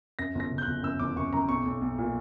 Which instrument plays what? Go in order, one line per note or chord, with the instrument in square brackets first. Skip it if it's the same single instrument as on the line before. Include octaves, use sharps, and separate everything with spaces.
[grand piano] F#2 A#6
G1
A#6
C#3
G6
F#6
G1
F#2 E6
G1 D6
F#2 C#6
F#2 A#5
B1 C#6
B1
B1
A#2